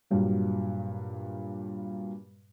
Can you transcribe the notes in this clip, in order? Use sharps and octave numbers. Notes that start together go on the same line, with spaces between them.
G2 A#2 F#3 G3